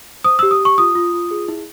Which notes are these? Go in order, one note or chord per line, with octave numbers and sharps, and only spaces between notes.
C5 D#6
E6
G4
D#6
G4
C#6
F4 D#6
F4
F4
G#4
E4